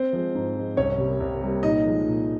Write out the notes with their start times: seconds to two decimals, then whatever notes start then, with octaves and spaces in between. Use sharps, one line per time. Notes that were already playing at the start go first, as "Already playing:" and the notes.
Already playing: C4 C5
0.13 F3 G#3
0.35 G#2
0.56 F3 G#3
0.77 C2 C#4 C#5
0.98 C3 G3 A#3
1.20 C2
1.41 C3 G3 A#3
1.63 A#2 D#4 D#5
1.85 F3 G#3
2.06 A#2